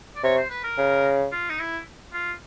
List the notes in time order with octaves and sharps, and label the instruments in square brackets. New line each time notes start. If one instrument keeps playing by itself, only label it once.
[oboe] D5
[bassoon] C3 [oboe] C#5
[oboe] C5
B4
A#4
[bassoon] C#3
[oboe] F4
D#4
E4
F4